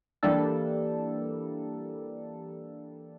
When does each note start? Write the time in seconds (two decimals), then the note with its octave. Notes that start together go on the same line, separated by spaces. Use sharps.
0.23 E3 G3 A#3 D4 A4